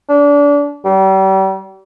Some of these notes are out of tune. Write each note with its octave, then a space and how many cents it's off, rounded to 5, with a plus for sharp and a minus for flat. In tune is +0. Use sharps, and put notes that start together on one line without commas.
D4 -30
G3 -35